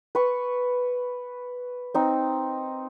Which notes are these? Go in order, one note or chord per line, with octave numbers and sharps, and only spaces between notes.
B4 C#6
C4 D#4